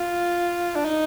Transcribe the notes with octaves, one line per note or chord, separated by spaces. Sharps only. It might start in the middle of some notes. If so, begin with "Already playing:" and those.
Already playing: F4
D4
D#4